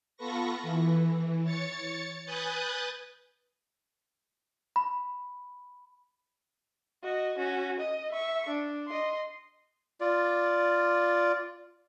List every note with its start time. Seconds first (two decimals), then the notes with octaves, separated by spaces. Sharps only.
0.17 B3 F4 A4 B4 C#6 A#6
0.63 E3
1.43 C#5 A6 C#7
2.26 B4 G#5 D#6 F#6 G6 A6
4.76 B5
7.03 F#4 D#5
7.38 C#4 F#4
7.79 D#5
8.12 E5 C#6
8.48 D4
8.88 D#5 C6
10.01 F4 D5